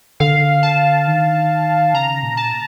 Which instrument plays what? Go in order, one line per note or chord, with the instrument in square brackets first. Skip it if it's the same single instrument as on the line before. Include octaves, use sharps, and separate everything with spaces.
[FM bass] D3 [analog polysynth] F5
[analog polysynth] A5
[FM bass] D#3
[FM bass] C#3 [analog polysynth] A#5
[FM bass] A#2
[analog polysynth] A5